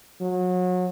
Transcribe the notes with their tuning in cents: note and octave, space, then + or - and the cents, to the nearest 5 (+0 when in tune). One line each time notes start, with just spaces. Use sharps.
F#3 -30